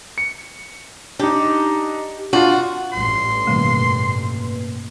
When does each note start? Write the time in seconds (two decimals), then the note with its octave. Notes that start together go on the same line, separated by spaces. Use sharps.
0.18 C#7
1.19 D4 D#4 G4
2.33 D4 F4 F#4
2.93 A1 G2 C6
3.47 B2 D#3 G3 A3 A#3 B4